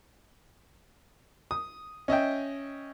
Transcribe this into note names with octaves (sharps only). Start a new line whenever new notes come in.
D#6
C#4 D#5 E5 G5